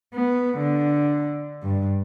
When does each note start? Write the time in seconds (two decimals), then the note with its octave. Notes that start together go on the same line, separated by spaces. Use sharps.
0.14 B3
0.57 D3
1.62 G2